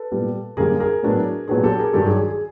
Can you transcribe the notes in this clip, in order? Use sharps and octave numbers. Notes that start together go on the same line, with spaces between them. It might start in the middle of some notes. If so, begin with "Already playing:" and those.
Already playing: A4 B4
A#2 G3 B3
F#2 D3 G3 A#3 G#4 A#4
G#4 A#4
A2 F#3 B3 D4
A#2 F#3 B3 D4 G#4
G4 A4
G#4 A#4
G2 D#3 F#3 G4 A4
G#4
G#4
G#4